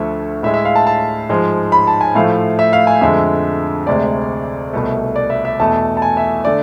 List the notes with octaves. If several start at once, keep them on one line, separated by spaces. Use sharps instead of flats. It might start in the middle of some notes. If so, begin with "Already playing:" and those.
Already playing: D2 D3 F3 A3 E5
A2 G#3 E5
E5
F5
A5
A5
G#2 F3 G#3
B5
A5
G#5
A2 F3 A3 F5
E5
F5
G#5
F2 D3 G#3 E5
D2 C3 G#3 D5
C2 B2 A3
D5
E5
E5
E2 B2 A3 A5
A5
G#5
E5
D3 A3 D5